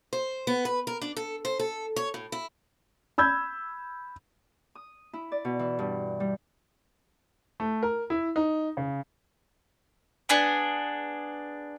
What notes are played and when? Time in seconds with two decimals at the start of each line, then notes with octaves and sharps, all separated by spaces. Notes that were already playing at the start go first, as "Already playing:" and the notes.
0.13 C5
0.47 B3
0.65 B4
0.87 A#4
1.02 D4
1.17 A4
1.45 C5
1.59 A4
1.96 C#5
2.14 A2
2.32 E4
3.18 B5 E6 G6 G#6
4.75 D#6
5.13 E4
5.32 D5
5.45 B2
5.59 E3
5.79 G2
6.20 G3
7.60 A3
7.83 A#4
8.10 E4
8.36 D#4
8.77 C#3
10.29 B3 D4 G#4